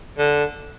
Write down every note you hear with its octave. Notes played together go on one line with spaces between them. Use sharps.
D3